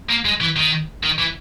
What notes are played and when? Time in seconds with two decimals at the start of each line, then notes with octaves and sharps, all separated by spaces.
0.10 A#3
0.25 G#3
0.41 E3
0.56 D#3
1.03 D#3
1.18 E3